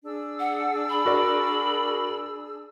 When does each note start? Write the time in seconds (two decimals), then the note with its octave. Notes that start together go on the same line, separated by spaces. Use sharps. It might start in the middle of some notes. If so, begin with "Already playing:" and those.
0.04 D4 G#4 E6
0.40 F#5
0.90 B5
1.06 F#4 A#4 D5